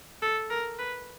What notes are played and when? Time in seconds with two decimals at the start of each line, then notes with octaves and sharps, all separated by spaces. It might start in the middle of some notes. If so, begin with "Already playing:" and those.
0.22 A4
0.50 A#4
0.79 B4